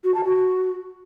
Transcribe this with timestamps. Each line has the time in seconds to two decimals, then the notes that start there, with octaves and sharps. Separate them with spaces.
0.04 F#4
0.14 A5
0.25 F#4